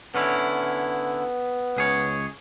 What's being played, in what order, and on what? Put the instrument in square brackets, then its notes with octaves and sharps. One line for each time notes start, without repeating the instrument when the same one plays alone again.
[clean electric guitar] D3 C#4 E4 [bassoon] B3
[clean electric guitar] C#2 G#4 C#5